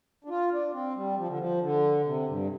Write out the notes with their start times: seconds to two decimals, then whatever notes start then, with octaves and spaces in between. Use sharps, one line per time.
0.24 D4
0.29 F4
0.51 D4
0.73 C4
0.95 G3
1.17 F3
1.28 D3
1.38 F3
1.62 D3
2.05 C3
2.28 G2